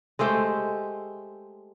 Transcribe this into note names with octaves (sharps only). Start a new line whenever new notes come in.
G#3 A3 G4 C5